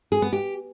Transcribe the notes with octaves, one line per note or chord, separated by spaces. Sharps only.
G#4
B3
G4